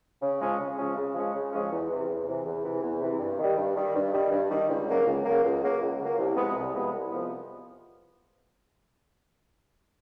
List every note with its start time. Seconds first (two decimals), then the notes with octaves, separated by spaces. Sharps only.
0.22 C#3
0.40 F3 G#3 C#4
0.59 C#3
0.77 F3 G#3 C#4
0.96 C#3
1.15 F3 G#3 C#4
1.34 C#3
1.52 F3 G#3 C#4
1.71 E2
1.89 C3 E3
2.08 E2
2.26 C3 E3
2.46 E2
2.64 C3 E3
2.82 E2
3.01 C3 E3
3.20 G2
3.38 D#3 G3
3.57 G2
3.76 D#3 G3
3.95 G2
4.13 D#3 G3
4.31 G2
4.50 D#3 G3
4.68 C#2
4.87 C#3 F#3 A#3
5.06 C#2
5.25 C#3 F#3 A#3
5.43 C#2
5.62 C#3 F#3 A#3
5.81 C#2
5.99 C#3 F#3 A#3
6.18 C2
6.36 C3 F3 G#3 B3
6.55 C2
6.74 C3 F3 G#3 B3
6.93 C2
7.11 C3 F3 G#3 B3